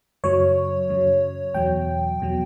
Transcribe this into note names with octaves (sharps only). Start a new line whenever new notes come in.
F#2 C#3 F#3 C#5
F#2 C#3 F#3
E2 B2 F#3 G5
E2 B2 F#3